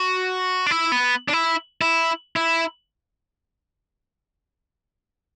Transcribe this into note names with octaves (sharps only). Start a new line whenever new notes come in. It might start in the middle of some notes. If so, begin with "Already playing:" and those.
Already playing: F#4
D4
E4
B3
D4
E4
E4
E4